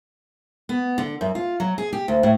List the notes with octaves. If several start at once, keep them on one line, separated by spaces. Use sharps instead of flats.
B3
D3
F#2
F4
F#3
G#4
G4
D2
A2